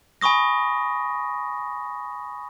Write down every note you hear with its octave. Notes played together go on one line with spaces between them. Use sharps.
G#5 B5 C#6 D#6 A#6